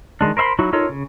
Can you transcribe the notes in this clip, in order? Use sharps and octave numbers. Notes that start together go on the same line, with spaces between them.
D#3 F3 G#3 D4
A#4 C5 E5 B5 C6
F#3 D#4 E4 F#4
D#4 F4 A4 A#4 C#5
C#3